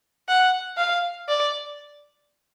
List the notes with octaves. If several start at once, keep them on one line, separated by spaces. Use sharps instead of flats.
F#5
F5
D5